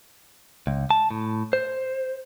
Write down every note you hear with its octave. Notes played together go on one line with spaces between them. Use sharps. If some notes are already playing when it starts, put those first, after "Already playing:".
C#2
A5
A2
C5